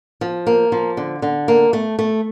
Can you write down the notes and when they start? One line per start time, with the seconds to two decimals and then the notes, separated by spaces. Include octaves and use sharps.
0.21 F3
0.47 A#3
0.72 F3
0.97 D3
1.22 D3
1.48 A#3
1.73 A3
1.99 A3